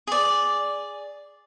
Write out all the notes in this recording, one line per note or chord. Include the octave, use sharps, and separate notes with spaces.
G#4 D5